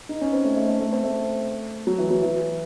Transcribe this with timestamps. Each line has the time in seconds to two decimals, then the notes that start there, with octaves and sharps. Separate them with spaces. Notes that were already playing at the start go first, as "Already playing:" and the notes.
0.09 D#4
0.21 C#4
0.33 C4
0.45 A3
0.56 A3
0.68 A3
0.80 A3
0.92 C4
1.04 A3
1.87 F#3
1.98 E3
2.10 F#3
2.23 E3